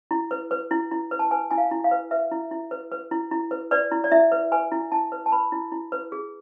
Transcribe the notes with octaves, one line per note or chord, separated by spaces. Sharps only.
E4
B4
B4
E4
E4
B4
A5
B4 G#5
E4 G#5
F5
E4
F5
B4
B4 E5
E4
E4
B4
B4
E4
E4
B4
B4 D5
E4
D5
E4 E5
B4
B4 G#5
E4
E4 A5
B4
A5
B4 B5
E4
E4
B4
G#4